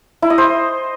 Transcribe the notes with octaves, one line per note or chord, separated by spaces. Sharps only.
E4
D#5
C5